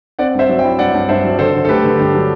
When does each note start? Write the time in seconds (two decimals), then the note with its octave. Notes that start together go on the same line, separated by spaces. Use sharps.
0.19 C4 D5 F#5
0.34 G2 C5 E5
0.49 F#3
0.59 E5 G5
0.64 E4
0.79 G2 D5 F#5
0.94 G2
1.09 G2 C5 E5
1.24 F#3
1.39 D3 A4 C5
1.54 D3
1.65 A4
1.69 A3 G4 B4
1.84 D3
1.99 G2 G4
2.14 F#3